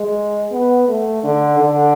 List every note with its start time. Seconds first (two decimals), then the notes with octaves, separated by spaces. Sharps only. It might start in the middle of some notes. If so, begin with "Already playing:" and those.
Already playing: G#3
0.52 B3
0.88 A3
1.23 D3
1.59 D3